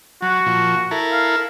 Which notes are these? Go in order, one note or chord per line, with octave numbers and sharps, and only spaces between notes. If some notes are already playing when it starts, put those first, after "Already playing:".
F#3 F#4
A#2 F3
E4 A4 A#4
F5